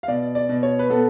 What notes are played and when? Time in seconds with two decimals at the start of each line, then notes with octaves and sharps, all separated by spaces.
0.03 F5
0.08 B2 D5
0.35 D5
0.49 B2
0.63 C#5
0.79 B4
0.90 B3 A4